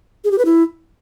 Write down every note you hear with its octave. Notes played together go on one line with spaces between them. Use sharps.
G#4
G4
B4
E4